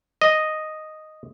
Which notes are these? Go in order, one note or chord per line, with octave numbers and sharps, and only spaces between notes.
D#5